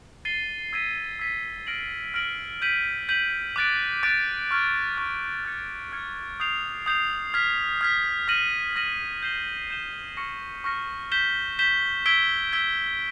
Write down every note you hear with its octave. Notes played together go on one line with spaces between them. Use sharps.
A6 C7 D#7 G7
E6 G#6 B6 D#7
E6 G#6 B6 D#7
F6 A#6 D7 F#7
F6 A#6 D7 F#7
G6 B6 D#7 F#7
G6 B6 D#7 F#7
D6 F#6 A6 D7
D6 F#6 A6 D7
C#6 F6 G#6
C#6 F6 G#6
F6 G#6 C#7
F6 G#6 C#7
D#6 G6 C7 F7
D#6 G6 C7 F7
F6 G#6 B6
F6 G#6 B6
F6 A#6 D#7 F#7
F6 A#6 D#7 F#7
G6 C7 E7 G7
G6 C7 E7 G7
C#6 F6 A#6 C#7
C#6 F6 A#6 C#7
G6 B6 E7 G7
G6 B6 E7 G7
E6 G#6 B6 D7 G7
E6 G#6 B6 D7 G7